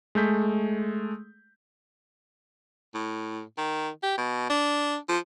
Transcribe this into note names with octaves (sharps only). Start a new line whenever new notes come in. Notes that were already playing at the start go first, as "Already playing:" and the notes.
G#3 A3 G6 B6
A2
D#3
G4
B2
D4
F3